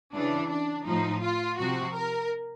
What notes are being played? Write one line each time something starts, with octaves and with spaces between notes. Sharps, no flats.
C#3 E3 D4
D4
A2 F3 D#4
F4
C3 F3 F#4
A#4